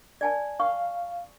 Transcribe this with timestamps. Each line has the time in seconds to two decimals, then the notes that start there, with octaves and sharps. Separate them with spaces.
0.21 D5 G#5 A5
0.60 F5 C#6